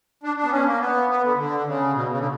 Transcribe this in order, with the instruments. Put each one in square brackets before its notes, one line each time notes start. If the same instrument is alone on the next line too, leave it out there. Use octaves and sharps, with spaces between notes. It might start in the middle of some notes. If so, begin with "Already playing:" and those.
[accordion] D4
D4
B3
C#4
A#3
B3
B3
D3
D3
C#3
B2
C#3
D3